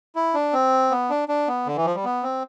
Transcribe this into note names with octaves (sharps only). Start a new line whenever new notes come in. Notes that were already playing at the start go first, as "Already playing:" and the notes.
E4
D4
C4
B3
D4
D4
B3
D3
E3
F3
G3
B3
C4